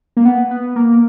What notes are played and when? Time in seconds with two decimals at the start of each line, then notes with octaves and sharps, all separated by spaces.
0.17 A#3
0.25 B3
0.51 B3
0.76 A#3